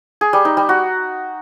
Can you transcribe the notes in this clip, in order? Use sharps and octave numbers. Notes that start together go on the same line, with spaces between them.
G#4
G3
D#4
G3
F#4